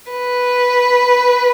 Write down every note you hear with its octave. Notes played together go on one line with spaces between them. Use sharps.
B4